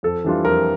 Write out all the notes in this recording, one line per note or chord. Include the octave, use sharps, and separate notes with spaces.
F2 A4
E3 G3 D4 F4
F2 A#4